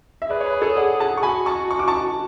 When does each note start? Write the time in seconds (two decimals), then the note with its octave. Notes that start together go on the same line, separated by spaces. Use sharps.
0.22 E5
0.30 G#4 B4 D5
0.41 C#5
0.46 B4
0.61 A4 C#5
0.76 D5 F#5
1.00 F#5 A5
1.17 C#6
1.23 F#4 G#5 B5
1.46 A5 C#6
1.71 C#6
1.79 D6
1.88 A5 C#6